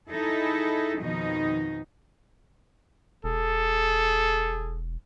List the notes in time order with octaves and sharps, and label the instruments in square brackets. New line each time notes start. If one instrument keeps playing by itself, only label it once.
[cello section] D#4 E4 G#4 A4
F2 B2 D#3 F3 D#4
[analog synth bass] E1 [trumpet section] G#4 A4